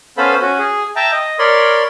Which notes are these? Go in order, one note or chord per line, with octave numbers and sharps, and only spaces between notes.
B3 C#4 A4 C5 F5 B5
C#4 F#4
G#4
E5 G5 A5 A#5
D#5
A#4 C#5 D5 B5 C6